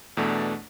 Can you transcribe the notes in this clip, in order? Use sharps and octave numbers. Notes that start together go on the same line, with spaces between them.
E2 B2 A3 D4